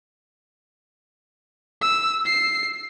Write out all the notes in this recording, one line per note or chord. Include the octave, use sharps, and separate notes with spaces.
E6
C7